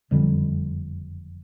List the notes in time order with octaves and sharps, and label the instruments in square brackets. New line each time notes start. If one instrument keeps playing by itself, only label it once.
[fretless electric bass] F#1 F2 D3 G3 [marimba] F3